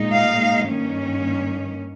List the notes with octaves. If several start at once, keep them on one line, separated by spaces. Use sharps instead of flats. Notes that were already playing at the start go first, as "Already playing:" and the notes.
Already playing: A#2 G#3 D#4
F5
G2 D#3 A#3 C#4